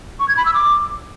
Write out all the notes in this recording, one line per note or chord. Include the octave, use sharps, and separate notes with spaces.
C#6
G#6
B5
E6
D6